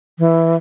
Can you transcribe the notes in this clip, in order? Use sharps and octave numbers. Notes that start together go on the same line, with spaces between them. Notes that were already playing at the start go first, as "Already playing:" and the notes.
E3